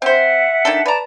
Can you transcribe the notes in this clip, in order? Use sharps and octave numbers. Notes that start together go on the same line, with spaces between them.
C4 C5 E5 F#5
D#3 D4 A4
B4 D5 A5 A#5